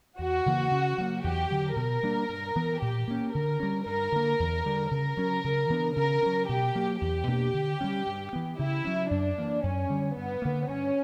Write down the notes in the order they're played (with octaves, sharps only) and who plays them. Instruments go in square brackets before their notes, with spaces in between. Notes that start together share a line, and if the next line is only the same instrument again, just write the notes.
[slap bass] E2 [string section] F#4
[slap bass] C#3 E3 A#3
C#3
F#3 A#3
[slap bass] E2 [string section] G4
[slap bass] D3 F#3
[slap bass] B2 [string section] A#4
[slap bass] G3 A#3 D4
G2
E3 B3
[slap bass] A#2 [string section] G4
[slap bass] A#3 C#4
[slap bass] D3 [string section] A#4
[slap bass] G3 C#4
[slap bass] G2 [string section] A#4
[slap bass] D3 A#3
E2
D3 G3
[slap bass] C#3 [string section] A#4
[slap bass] F#3 C#4
C#3
E3 B3 D4
[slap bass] C#3 [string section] A#4
[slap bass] F#3 C#4
[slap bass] B2 [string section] G4
[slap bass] F#3 A#3
[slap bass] E2 [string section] G4
[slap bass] B2 A#3 D4
D3
G3 A#3 C#4
G2
E3 B3
[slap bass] C#3 [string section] E4
[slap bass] F#3 C#4
[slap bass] F#2 [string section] D4
[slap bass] E3 A#3
[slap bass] F#2 [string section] C#4
[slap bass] D3 G3
[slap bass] G2 [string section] B3
[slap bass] D3 A#3
[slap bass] G2 [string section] C#4